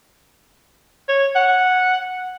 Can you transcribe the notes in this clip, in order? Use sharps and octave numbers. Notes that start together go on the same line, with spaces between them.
C#5
F#5